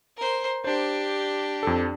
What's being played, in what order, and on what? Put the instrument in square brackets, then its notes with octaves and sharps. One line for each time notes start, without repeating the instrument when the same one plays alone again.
[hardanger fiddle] A#4 C5
[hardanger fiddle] D4 G4 [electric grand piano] C5
[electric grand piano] F2 A4